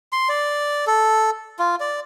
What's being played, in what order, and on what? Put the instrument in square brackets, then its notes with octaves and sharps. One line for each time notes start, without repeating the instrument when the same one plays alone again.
[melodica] C6
D5
A4
F4
D5